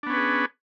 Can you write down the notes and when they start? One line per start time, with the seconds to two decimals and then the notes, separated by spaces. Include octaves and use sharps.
0.03 D4
0.07 B3
0.10 C#4
0.13 B4
0.17 G#4